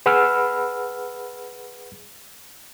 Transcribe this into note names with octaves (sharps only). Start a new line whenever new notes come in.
G#4 B4 F#5 B5 E6 F6